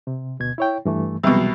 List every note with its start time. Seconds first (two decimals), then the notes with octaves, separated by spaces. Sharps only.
0.07 C3
0.39 D2 B2 G#6
0.58 E4 C#5 G5
0.85 G2 E3 A3
1.24 C2 B2 E3 F#3 G#3